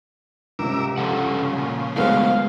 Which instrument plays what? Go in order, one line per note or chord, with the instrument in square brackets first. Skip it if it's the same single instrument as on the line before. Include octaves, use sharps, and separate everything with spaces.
[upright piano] C#2 C3 [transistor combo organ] A#4 D6 E6
[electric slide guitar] G2 A4 F#5 [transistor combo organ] C#3 F3
[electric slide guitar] A#2
[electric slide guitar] G#2 F#3 A3 [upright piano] G#3 B3 C4 [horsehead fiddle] F5